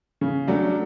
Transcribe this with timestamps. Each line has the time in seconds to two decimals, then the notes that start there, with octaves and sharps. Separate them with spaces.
0.21 C#3
0.47 F#3 A3 D4